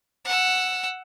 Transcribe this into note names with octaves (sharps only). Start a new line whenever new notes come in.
F#5 E6